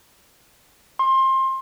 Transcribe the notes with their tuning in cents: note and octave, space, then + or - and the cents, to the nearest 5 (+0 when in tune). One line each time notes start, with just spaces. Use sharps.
C6 +25